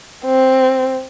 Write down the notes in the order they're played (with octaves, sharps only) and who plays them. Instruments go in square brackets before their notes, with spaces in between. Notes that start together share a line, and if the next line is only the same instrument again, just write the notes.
[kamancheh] C4